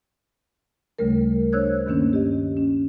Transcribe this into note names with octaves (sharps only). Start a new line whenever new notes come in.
D2 C#3 G3 A3 A#4
D4 C5 C#5 E6 F#6 G#6
G2 D#3 A#3 C#4 D4
G4 D#5
C#4